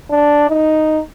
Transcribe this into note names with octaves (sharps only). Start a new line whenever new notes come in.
D4
D#4